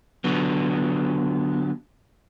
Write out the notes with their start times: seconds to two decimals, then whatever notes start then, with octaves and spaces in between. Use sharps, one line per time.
0.24 D3 F#3 B3